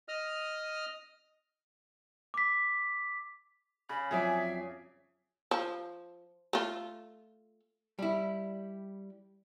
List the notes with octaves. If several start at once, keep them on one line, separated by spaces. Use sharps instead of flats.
D#5 D#6 F6
D6 B6
C#3 B5
F2 F#3 G#4 D5 E5
F3
A3 F4
G3 E4